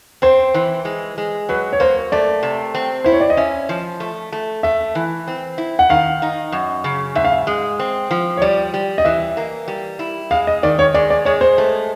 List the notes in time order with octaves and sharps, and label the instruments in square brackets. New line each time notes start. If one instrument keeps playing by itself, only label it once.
[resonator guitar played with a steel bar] C4 [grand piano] C5
[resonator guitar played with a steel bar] E3
G#3
G#3
[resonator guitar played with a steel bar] F#3 [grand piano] B4
[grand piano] C#5
[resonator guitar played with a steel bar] A#3 [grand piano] C5
[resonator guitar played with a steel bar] A3 [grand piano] D5
[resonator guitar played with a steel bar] C3
C4
[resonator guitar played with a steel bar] E4 [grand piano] C5
[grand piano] C#5
D5
D#5
[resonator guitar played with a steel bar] C#4 [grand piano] E5
[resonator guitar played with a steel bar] F3
A3
A3
[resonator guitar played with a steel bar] A3 [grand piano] E5
[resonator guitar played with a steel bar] E3
C4
E4
[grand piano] F#5
[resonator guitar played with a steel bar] D#3 [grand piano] F5
[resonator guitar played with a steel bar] D#4
F#2
C#3
[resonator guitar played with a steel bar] G#2 [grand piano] E5
[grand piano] F5
E5
[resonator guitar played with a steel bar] G#3
C4
F3
[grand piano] C#5
[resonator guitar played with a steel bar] G3 [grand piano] D5
[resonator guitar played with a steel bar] G3
[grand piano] D#5
[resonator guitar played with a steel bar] E3 [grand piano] E5
[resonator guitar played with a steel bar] A#3
G3
E4
[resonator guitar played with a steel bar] G#3 [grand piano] F5
[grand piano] D#5
[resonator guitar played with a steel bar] D#3 [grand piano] D5
[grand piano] C#5
[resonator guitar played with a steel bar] G#3 [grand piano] D5
[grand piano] D5
[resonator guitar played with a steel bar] G#3 [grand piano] C#5
[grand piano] C5
[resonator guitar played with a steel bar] A3